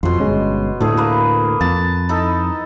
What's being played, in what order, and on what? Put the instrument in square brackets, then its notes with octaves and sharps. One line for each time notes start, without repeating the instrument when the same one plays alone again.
[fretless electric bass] F2 F3 [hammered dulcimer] B2 C6
[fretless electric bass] G1 G#3 C#4
[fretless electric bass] D2 A2 [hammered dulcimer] A3 G#4
[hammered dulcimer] A#3 B4
[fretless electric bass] F2 [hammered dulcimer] A5
[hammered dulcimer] D#4 E4 A4